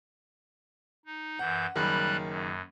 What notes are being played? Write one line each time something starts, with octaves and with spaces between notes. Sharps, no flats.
D#4
F#2 E3 F#5 G6
F#1 D#3 G3 B5 F#6
F#2